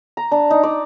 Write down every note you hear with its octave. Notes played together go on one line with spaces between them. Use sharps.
A#5
D4
D#4
D5